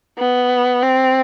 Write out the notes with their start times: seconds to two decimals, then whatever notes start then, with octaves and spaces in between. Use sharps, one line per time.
0.19 B3
0.83 C4